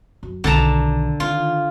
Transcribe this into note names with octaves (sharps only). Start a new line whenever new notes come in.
F#2
B1 D3 D#3 A5 A#5
D#3 F4